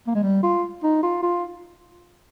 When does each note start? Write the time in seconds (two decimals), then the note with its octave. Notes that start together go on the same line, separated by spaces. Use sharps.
0.07 A#3
0.15 G#3
0.23 G3
0.43 F4
0.83 D#4
1.03 F4
1.23 F4